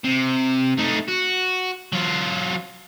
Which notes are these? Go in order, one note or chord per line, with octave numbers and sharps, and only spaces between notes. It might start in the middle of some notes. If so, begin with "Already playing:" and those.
C3
A3 D#4
F#4
F#3 F4